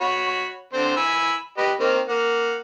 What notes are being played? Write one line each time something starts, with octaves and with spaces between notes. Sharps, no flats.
F#4 C#5 B5
D3 C4 C5
G#5 B5 E6
G4 B4 D#5
D#3 A#3 C4
A#3 F#5